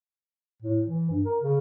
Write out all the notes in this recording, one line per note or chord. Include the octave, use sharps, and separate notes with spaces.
A2
E3
G2
A#4
C#3